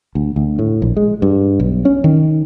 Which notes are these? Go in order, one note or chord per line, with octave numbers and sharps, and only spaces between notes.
D2
D2
A2
A#1
G#3
G2
B1
C#4
D#3